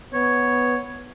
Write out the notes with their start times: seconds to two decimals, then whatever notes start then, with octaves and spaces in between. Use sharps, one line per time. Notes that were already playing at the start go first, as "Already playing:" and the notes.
0.14 B3 C#5